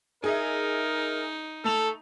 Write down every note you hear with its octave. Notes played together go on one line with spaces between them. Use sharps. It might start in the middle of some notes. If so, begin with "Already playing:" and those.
D#4 G#4 A#4 D#5 E5
A3 A4 F7